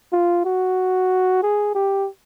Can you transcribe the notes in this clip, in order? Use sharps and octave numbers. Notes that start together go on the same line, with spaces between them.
F4
F#4
G#4
G4